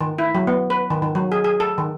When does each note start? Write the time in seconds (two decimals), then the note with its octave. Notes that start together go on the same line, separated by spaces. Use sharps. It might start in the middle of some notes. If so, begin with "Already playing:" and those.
0.01 D#3
0.18 E4
0.35 F#3
0.47 B3
0.70 B4
0.90 D#3
1.02 D#3
1.15 F#3
1.32 G#4
1.44 G#4
1.60 A4
1.78 D#3